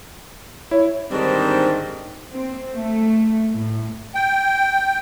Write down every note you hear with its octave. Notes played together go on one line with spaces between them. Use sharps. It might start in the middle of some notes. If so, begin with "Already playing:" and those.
E4 C#5
G#2 D3 D#3 G3 C4 D4
C4
A3
A2
G5